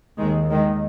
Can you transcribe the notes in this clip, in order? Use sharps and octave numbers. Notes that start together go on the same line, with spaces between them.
D#2 D#3 G#3
D#3 G#3